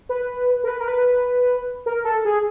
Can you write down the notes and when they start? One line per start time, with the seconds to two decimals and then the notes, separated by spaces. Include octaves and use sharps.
0.09 B4
0.64 A#4
0.68 B4
0.81 A#4
0.88 B4
1.86 A#4
2.04 A4
2.25 G#4